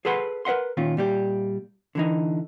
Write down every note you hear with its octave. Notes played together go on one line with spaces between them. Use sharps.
G#4 A4 B4 F#5 C6
A#4 B4 E5 F#5 C6
A#2 D#3 C#4 F4
A#2 G3 G4
D3 E3 D#4